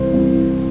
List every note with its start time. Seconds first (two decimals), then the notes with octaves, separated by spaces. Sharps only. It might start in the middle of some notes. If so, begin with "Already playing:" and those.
Already playing: C2 C3 E3 C5
0.14 C2 C3 E3